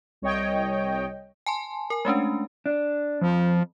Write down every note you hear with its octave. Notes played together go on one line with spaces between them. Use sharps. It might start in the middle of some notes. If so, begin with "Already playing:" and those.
C2 C#5 D#5 G5
G#5 A5 C6
A#4 G#5
G#3 A3 C#4 D4
D4
F2 F3